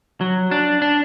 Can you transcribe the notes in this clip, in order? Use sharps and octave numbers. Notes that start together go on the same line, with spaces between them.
F#3
D4
D4